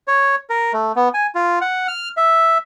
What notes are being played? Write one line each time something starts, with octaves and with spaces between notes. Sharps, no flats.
C#5
A#4
A3
B3
G#5
F4
F#5
F6
E5